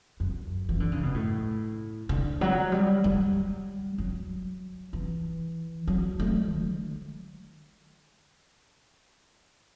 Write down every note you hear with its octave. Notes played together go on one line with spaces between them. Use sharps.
F#2
E3
D3
C#3
B2
A2
D3
F#3
G3
G3
F#3
E3
F#3
A3
D3